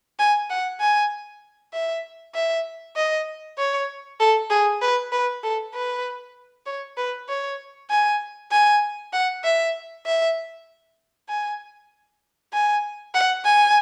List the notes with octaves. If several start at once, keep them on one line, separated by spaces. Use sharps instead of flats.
G#5
F#5
G#5
E5
E5
D#5
C#5
A4
G#4
B4
B4
A4
B4
C#5
B4
C#5
G#5
G#5
F#5
E5
E5
G#5
G#5
F#5
G#5